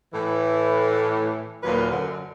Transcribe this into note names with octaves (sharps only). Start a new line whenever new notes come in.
A2 E3
D#2 A#2 F#3 F4 B4 F5
F#2 D3